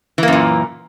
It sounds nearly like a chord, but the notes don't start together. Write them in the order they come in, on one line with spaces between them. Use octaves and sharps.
E3 A#3 F#2 A#2